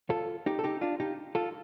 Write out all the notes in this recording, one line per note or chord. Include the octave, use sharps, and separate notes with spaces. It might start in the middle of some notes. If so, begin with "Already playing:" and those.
F4 A4
D#4 G4
A4
D#4 G4
D4 F4
D#4 G4
F4 A4